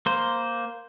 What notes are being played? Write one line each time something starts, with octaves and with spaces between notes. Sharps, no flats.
A#3 C5